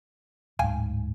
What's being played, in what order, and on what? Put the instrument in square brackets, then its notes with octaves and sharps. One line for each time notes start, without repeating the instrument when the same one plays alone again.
[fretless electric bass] D1 G#2 [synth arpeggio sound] F5 G5 G#5